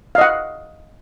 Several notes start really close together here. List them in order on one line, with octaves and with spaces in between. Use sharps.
F5 D#5 F#5